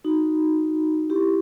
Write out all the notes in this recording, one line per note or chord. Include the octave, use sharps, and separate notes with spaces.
D#4 F#4
E4 G4